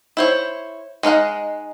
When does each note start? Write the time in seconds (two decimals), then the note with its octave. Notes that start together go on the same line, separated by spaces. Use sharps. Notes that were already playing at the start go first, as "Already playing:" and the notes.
0.17 E4 C5 C#5
1.03 G#3 D#4 F5 F#5